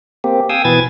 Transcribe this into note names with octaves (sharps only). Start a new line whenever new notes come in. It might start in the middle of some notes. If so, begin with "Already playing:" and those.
A#3 C4 G4
F5 G5 G#5 D#6 E6
B2 E3 B4 G#5 G#6 A6